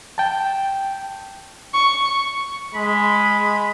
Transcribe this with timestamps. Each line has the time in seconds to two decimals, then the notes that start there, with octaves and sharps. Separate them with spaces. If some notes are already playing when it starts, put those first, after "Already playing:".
0.18 G5 A5
1.73 C#6
2.74 G#3 B5